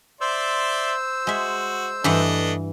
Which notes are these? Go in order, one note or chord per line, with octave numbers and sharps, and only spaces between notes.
C5 D5 E5 C6 E6
G#3 F#4 E5
G2 E3 A3 D4 D#5 F#5